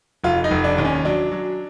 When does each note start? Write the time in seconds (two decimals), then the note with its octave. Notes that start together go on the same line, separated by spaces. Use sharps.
0.24 F1 F4
0.44 D#4
0.51 F1
0.64 D4
0.78 D#2
0.85 C#4
1.05 F#3 D4
1.32 F#3